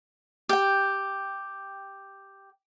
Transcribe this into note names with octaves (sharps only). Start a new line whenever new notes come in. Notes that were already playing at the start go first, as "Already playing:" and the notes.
G4 G5